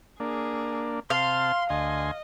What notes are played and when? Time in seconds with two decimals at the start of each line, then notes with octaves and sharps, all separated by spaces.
0.20 A#3 D4 G#4
1.10 C3 F5 A5 C6
1.70 D2 D#5 G#5 C6